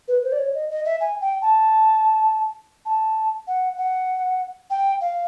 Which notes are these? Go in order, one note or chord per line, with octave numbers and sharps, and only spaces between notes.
B4
C5
D5
C#5
D#5
D#5
E5
G#5
G5
A5
A5
F#5
F#5
G5
F5